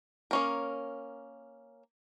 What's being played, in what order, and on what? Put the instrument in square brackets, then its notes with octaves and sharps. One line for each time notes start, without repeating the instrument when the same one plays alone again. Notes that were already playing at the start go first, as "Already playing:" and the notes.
[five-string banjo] A#3 C#4 A#4